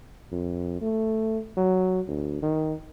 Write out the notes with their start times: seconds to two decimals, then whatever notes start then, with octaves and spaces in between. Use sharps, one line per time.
0.32 F2
0.81 A3
1.57 F#3
2.07 D2
2.42 D#3